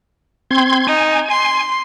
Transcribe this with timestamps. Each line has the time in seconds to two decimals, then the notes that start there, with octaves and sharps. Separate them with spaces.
0.51 C4 C6 G#6
0.87 D#4 G#5
1.31 C6